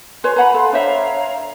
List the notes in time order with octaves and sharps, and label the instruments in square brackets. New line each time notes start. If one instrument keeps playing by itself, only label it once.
[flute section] F#4 G#5 C6 [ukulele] B4 C#5
[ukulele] B4 F#5 B5 [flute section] G#5 A#5
[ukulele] A4 [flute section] F5 B5 C6
[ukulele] D4 C5 E5 [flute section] C#5 F5 A#5